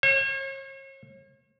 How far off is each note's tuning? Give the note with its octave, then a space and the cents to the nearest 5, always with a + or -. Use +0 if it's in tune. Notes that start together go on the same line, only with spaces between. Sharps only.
C#5 -40